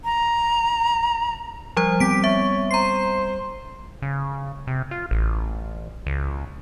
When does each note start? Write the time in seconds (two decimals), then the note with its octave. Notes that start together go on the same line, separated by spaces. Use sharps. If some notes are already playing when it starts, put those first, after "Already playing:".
0.04 A#5
1.77 F3 G3 C5
2.00 G3 B3 C4 G4 B6 D7
2.24 C#5 E5
2.71 C5 A#5 C7
4.02 C#3
4.67 C3
4.91 F4
5.11 A1
6.07 C#2